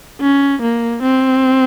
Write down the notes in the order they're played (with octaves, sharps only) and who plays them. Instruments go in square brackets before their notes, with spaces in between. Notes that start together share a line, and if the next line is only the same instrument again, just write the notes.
[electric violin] C#4
A#3
C4